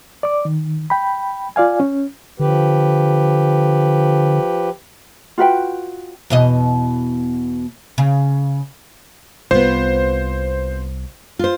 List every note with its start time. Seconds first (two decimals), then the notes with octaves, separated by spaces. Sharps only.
0.23 D5 D6
0.45 D#3
0.90 G5 B5
1.56 F4 D5 F5 G#5
1.80 C#4
2.39 D3 F3 G4 B4
5.38 F4 F#4 B4 G5
6.30 E2 B2 D#5
7.98 C#3
9.51 C2 B3 F4 C5
11.39 F4 C5